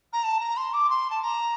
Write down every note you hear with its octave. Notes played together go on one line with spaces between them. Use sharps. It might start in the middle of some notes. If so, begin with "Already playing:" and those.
A#5
A5
A#5
C6
D6
C6
A5
A#5